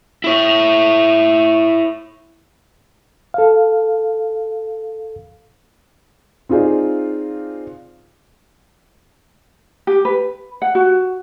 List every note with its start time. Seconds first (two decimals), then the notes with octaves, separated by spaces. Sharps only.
0.24 E4 C#5
3.34 A4 F5
6.49 C4 D#4 F4 G#4 D5
9.87 G4
10.05 B4
10.62 F#5
10.75 F#4